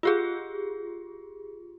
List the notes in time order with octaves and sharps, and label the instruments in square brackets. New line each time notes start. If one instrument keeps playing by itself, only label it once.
[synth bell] F4 G4 G#4